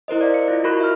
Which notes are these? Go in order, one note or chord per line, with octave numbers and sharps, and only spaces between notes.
E4 A#4 C5 D#5
D5 F5
C#7
E4 F4 D#5
F4 F#4 A#4 B5 C#6 F#6
E5 F6